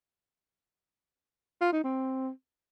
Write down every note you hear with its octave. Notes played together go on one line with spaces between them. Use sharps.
F4
D#4
C4